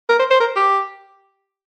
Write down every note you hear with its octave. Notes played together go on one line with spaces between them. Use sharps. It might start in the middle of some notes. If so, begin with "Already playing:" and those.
A#4
C5
C5
A#4
G4